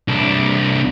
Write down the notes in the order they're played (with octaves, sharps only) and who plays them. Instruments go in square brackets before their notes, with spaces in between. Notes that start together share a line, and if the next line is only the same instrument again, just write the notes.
[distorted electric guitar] C2 D4